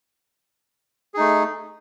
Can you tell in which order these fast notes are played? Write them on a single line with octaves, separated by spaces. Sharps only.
G#4 D#4 A3